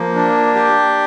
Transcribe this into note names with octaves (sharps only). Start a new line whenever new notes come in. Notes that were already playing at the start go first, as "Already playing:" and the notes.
Already playing: F3 A#3
D4
G4